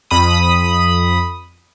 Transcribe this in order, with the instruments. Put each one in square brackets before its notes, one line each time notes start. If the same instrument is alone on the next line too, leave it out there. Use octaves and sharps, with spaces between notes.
[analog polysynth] F2 B5 D#6